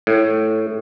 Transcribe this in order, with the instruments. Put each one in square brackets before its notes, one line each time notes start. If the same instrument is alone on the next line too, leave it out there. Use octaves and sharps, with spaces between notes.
[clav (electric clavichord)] A2